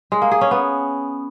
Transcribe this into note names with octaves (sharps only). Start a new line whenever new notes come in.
G#3
A#3
G#4
C#4
B3